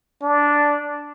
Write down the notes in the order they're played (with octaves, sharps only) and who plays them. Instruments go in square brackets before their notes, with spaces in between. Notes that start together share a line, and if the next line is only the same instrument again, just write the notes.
[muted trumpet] D4